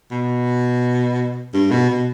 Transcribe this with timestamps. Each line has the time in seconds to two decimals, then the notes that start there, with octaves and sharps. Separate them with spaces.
0.11 B2
1.53 G2
1.71 B2
1.90 B2